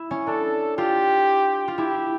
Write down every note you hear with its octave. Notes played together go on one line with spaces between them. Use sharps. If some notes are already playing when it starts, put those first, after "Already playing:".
Already playing: E4
C#4
D4 A4
F4 G4
F4
E4 G4